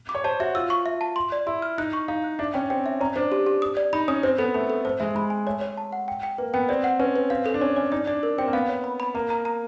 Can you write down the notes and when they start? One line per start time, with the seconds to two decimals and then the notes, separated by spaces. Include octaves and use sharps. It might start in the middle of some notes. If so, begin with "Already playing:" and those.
0.09 D6
0.15 C#5
0.24 C5 A5
0.40 F#4 E5
0.55 F4 E6
0.70 C#6
0.86 E5
1.01 A5
1.16 C6
1.32 D5
1.47 E4 C6
1.62 F6
1.78 D#4 F#6
1.93 C#6
2.08 D#4 F5
2.24 F#6
2.39 D4 E5
2.54 C#4 G5
2.70 C4 G5
2.86 E5
3.01 C#4 A#5
3.16 D4 C5
3.32 G4
3.47 G4
3.62 D#6
3.77 D5
3.93 D#4 B5
4.08 C#4 D#6
4.23 C4 C5
4.38 B3 A4
4.54 A3 A4
4.70 A4
4.85 A3 C5
5.00 G#3 E5
5.15 G#3 B5
5.30 G#5
5.46 A3 C#5
5.61 C#5
5.77 A5
5.93 F#5
6.08 G5
6.23 G5
6.38 A#3 B4
6.54 B3 G5
6.69 C4 D5
6.84 F#5
6.99 C#4 B4
7.16 B4
7.30 C4 F5
7.46 A4
7.54 D4
7.61 C#4 C#5
7.76 C#4 C#5
7.92 D#4 D5
8.07 D4 D5
8.23 A#4
8.38 C4 G5
8.47 A#3
8.53 B3 F5
8.69 C#5
8.84 B5
9.00 B5
9.15 A#3 A#5
9.30 A#5
9.45 A#5